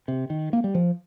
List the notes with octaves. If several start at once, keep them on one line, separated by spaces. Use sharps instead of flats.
C3
D#3
A#3
G3
F3